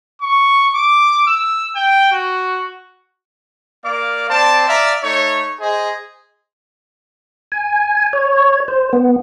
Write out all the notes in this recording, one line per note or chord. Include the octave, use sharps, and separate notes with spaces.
C#6
D6
E6
G5
F#4
A#3 D5 F5 D6
C4 C5 D5 A5
D5 E5 F5 A#5
A3 D#4 C#5
G#4 C5 D#5
G#5
C#5
C5
B3